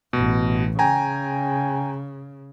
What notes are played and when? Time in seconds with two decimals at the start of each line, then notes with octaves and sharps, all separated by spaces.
0.13 A1 B2
0.79 C#3 G5 G#5 A#5